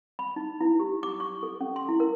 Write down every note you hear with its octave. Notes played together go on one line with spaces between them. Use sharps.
B5
D#4
E4
G4
D6
C#6
A4
C#4
C6
E4
A#4